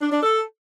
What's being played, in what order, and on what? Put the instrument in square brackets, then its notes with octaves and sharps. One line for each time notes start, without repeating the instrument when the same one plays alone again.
[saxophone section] D4
D4
A4